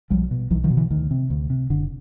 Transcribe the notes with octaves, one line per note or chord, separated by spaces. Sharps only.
B1 F3 G3
B2
B1 E3 F#3
D#3 F3
B2
D3 E3
D2 D#3
C3
D2
C3
F#1 D3